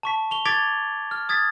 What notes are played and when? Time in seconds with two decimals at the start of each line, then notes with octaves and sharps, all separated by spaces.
0.03 A5 C#6 B6
0.31 C#6 F7 G7
0.45 D6 G#6 A6 B6 D7 F7
1.11 F6
1.29 D#6 G#6 A6 B6